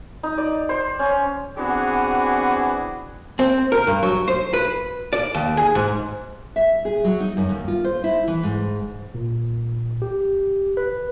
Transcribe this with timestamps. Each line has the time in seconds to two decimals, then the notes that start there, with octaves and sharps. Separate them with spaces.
0.23 D#4
0.38 D5
0.69 C5
0.99 C#4
1.58 E3 B3 C4 D4 F#4 G#4
3.39 C4
3.72 A#4
3.87 G2
4.03 F#3
4.28 C5
4.54 B4
5.13 D5
5.35 D#2
5.57 G#4
5.75 G#2
6.56 E5
6.85 G#4
7.04 F#3
7.20 D#4
7.37 F#2
7.49 D#2
7.68 F4
7.84 C5
8.04 E4
8.28 E3
8.43 G#2
9.14 A#2
10.02 G4
10.77 B4